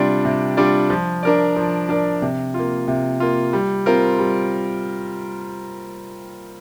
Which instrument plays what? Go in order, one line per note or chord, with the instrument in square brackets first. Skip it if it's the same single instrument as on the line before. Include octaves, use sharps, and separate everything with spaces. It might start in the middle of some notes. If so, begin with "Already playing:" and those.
Already playing: [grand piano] C3 G3 D4 F4 D5
C3
G3 D4 F4 D5
F3
D4 A#4 D5
F3
D4 A#4 D5
C3
F4
A#3
C3
A#3 F4
G3
C4 F4 A#4
G3